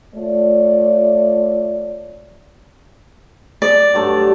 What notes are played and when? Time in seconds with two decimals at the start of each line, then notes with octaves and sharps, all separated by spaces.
0.15 A3 F4 C#5 D5
3.62 D5
3.94 G2 F#3 A3